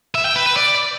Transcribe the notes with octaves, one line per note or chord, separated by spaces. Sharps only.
E5
G5
B4
B4
D5